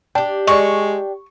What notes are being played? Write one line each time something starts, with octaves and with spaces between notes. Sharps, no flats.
D4 G4 G5 A5
G#3 D5 D#5 C#6